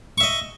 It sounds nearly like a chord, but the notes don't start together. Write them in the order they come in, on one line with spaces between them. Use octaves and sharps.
C#6 E5 D#5